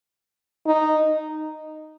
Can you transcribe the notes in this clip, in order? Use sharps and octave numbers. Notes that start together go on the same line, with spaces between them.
D#4